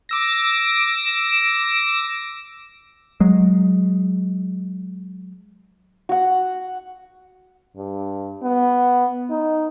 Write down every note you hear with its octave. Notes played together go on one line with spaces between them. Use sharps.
D6 E6 A#6
F#3 G#3
F#4 F#5
G2
B3
D#4